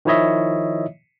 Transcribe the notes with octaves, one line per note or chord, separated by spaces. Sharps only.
D#3 F3 E4 C#5 D#5 E5